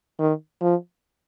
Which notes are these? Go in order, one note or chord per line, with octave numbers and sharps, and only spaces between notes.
D#3
F3